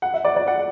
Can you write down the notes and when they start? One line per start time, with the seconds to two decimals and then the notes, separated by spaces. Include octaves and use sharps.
0.02 F#5
0.14 E5
0.25 D5
0.36 D5
0.47 F#5